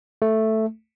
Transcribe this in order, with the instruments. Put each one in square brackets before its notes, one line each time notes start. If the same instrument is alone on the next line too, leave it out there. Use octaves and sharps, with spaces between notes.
[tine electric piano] A3